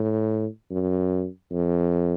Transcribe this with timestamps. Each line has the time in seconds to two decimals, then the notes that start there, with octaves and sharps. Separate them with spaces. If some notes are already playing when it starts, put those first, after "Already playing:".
Already playing: A2
0.71 F#2
1.51 F2